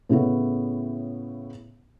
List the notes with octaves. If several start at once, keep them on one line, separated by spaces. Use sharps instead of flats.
A2 C#3 A3 B3